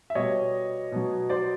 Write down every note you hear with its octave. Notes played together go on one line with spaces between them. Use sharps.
E5
B2 G3 C#5 D#5
B2 F#3
C5 D5